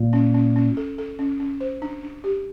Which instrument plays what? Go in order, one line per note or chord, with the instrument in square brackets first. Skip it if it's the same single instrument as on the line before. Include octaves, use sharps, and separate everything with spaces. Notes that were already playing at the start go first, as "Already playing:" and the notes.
Already playing: [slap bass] A#2
[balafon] C#4
C#4
C#4
A4
A4
C#4
C#4
C5
D4
D4
G4